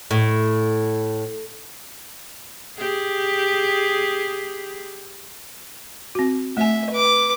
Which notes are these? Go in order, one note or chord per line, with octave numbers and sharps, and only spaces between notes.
A2
G4 G#4
C4 F#4
A3 E5 G#5
B4 D6